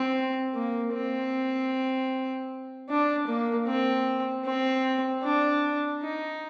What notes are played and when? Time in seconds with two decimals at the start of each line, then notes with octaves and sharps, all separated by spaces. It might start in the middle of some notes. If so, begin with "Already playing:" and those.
Already playing: C4
0.54 A#3
0.93 C4
2.89 D4
3.27 A#3
3.67 C4
4.45 C4
5.23 D4
6.01 D#4